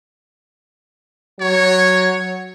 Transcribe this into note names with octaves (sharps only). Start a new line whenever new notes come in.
F#3 C#5